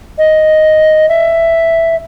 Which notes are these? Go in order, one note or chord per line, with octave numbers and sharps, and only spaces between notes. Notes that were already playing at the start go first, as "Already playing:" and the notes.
D#5
E5